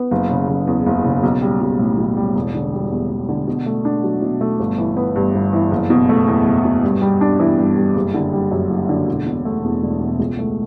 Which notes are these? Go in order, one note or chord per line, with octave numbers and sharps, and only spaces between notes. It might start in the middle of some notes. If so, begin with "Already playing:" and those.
Already playing: B3
F#1
C#3
F#1
E2
F#1
C#3
B1
G3
B1
A2
B1
G3
E1
D3
G3
E2
E1
D3
B2
A3
D4
F#3
B2
A3
G1
E3
B3
G2
G1
E3
F#1
B2
A3
E2
F#1
B2
G2
G3
D4
E3
G2
G3
F#1
D3
G3
F#2
F#1
D3
E1
B2
A3
E2
E1
B2
C#2
A3